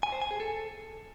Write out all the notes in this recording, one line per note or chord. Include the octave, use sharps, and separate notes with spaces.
G#5
C5
G#5
G#4
A4